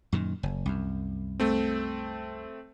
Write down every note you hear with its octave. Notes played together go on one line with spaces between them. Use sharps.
F#2 A#2 D#3
F#1
C2 F#2
A3 C4